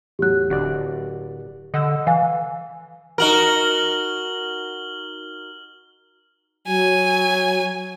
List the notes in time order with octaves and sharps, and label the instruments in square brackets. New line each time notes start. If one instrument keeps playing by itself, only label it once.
[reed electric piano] E2 A2 F#3 [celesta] G4 F#6
[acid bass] D1 [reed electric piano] D3 F#4 D5
[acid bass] D3 [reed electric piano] D#5 F#5 E6
[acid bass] E3 [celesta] F5 G#5
[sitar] D#4 F#4 A#4 [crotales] F6 F#7 G7
[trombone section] F#3 [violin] G#5